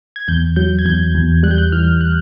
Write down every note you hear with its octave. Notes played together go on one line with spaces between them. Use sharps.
G#6
E2 G6
F#3 G6
G#6
E2 G6
E2
G3 F#6
G6
F#6
E3 F6
F#6